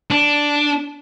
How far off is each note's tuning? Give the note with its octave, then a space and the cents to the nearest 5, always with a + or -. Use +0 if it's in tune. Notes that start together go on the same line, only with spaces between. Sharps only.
D4 -5